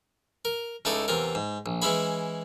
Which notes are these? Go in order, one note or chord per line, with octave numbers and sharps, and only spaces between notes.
A#4
C#2 A3 D#4 E4 D5 D#6
E2 C3 F4 A#4
G#2
A#1
E3 G#3 C#4 E4 G#4 B5